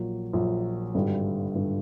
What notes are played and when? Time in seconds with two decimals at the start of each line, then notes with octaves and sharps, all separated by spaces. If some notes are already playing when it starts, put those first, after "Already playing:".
Already playing: A#1 A#2 F#3
0.33 A#1 A#2 F#3
0.95 G#1 G2 D3 G3
1.55 G#1 G2 D3 G3